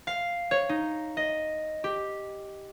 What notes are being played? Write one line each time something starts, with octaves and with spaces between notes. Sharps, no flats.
F5
C#5
D#4
D#5
G4